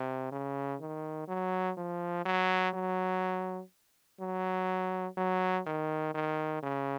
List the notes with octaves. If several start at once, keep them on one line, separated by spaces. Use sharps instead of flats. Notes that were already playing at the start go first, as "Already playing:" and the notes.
Already playing: C3
C#3
D#3
F#3
F3
F#3
F#3
F#3
F#3
D#3
D#3
C#3